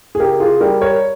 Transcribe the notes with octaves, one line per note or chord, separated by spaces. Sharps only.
G#4
C#3 G4 A#4
F4 G#4
G3 G4 A#4
A#4 C#5